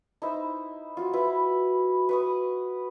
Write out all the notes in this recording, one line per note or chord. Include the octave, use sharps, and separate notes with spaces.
D#4 E4 C5
F4 F#4
E4 B4
B4 C#6 D#6